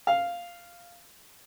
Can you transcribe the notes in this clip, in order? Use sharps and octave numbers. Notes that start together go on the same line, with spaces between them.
F5